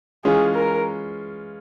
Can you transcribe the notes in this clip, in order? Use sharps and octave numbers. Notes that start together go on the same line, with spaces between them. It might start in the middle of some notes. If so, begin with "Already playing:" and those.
E3 G#3 C#4 F4 G#4
A#4